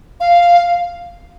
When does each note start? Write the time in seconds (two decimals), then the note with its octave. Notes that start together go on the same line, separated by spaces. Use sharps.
0.20 F5